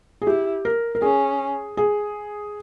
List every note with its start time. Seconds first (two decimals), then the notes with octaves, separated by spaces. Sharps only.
0.22 G#4
0.26 E4 G4
0.65 A#4
0.95 A#4
1.02 C#4 G#4
1.77 G#4